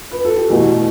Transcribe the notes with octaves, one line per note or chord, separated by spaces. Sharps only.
B4
A4
G4
E2 B2 A3 F#4